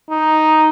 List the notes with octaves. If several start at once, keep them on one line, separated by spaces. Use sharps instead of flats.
D#4